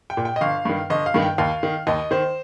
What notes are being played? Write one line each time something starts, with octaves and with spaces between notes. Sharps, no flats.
G5
A#2
G5
D#5
G1 F5
G2 D#3
G1 D#5
F5
G2 D#3
G5
D#2 F5
D#3
D#2 D#5
D#3 C5